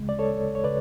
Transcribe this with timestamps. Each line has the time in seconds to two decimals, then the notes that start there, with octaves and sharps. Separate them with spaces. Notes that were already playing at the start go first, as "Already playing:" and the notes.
Already playing: D2 C#3 G#3
0.09 D5
0.19 A4 C#5
0.55 C#5
0.64 C#3 B4 D5